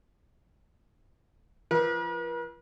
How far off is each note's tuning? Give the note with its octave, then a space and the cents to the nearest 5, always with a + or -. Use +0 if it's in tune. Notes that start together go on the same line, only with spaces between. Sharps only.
F3 -35 B4 -45